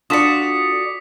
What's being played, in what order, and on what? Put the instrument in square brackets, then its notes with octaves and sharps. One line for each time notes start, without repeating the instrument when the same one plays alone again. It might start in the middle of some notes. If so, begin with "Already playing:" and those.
[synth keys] D4 F4 A4 [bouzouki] F#4 D5 [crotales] D#6 B6 C#7